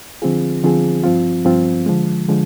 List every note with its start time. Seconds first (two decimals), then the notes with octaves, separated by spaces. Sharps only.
0.22 D3 F3 C4 F4 G#4
0.63 D3 F3 C4 F4 G#4
1.04 G2 F3 C4 F4
1.45 G2 F3 C4 F4
1.86 D3 F3 G#3
2.28 D3 F3 G#3